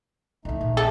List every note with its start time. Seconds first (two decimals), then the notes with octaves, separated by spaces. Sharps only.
0.45 C2 E3 A3 D#4
0.61 A#1
0.77 A4 E5